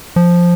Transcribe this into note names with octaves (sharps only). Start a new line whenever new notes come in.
F3